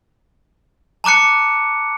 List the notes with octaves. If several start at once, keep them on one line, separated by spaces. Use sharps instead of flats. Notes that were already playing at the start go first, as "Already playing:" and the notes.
A5 A#5 D6 F#6 C#7